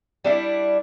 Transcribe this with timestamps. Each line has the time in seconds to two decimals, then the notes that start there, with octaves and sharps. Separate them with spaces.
0.24 G3 D4 E4